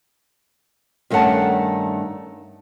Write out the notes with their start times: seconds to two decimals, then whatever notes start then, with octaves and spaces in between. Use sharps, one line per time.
1.10 G2 D#3 A3 C#4 F#5 A5